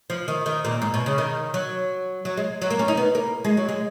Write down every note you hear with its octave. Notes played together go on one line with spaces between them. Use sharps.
F3
D#3
D#3
A#2
G#2
B2
C#3
D#3
F#3
F#3
G#3
F#3
A#3
C#4
D#4
B3
A#3
G#3
F#3
G#3